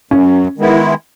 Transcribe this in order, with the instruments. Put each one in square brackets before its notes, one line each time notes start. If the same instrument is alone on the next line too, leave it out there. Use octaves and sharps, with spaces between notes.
[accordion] F#2 [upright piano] C#4
[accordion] D#3 G#3 B3 E4